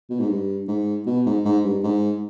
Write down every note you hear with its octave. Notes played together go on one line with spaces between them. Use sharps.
B2
G#2
G2
G#2
B2
G#2
G#2
G2
G#2